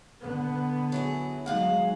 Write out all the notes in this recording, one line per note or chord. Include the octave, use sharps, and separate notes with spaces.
D3 B3
F#3 E4 G#4
D#2 F#3 G#3 F5 F#5